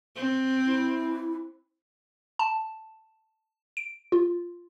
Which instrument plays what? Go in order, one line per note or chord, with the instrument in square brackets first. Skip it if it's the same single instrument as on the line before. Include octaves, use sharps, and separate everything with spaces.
[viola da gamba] C4
[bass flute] E4
[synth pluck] A5
D7
F4